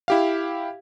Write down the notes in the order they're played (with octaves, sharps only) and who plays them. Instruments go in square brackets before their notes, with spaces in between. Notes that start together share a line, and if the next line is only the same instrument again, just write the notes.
[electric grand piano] E4 G4 F5